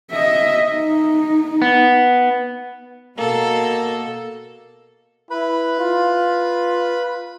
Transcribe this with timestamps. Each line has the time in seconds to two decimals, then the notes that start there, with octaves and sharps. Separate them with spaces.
0.11 D#5 E5
0.72 D#4
1.62 B3
3.18 B2 A#3 A4
5.31 E4 B4 B5
5.79 F4